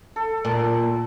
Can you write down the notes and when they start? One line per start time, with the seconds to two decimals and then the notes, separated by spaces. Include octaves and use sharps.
0.16 A4
0.45 A#2